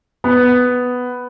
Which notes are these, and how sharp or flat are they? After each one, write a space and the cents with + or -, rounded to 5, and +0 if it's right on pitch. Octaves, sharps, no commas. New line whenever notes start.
B3 +5